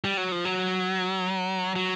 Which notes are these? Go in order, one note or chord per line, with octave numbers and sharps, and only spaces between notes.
G3
F#3
F3
F#3
F#3